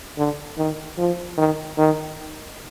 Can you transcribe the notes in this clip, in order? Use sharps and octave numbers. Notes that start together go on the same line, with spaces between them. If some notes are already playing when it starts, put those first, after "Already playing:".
D3
D#3
F3
D#3
D#3